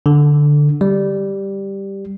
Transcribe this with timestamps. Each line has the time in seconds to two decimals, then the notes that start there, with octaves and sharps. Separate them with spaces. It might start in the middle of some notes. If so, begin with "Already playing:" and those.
0.06 D3
0.81 G3